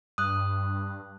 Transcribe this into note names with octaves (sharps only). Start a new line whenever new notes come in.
G2 D#6 F#6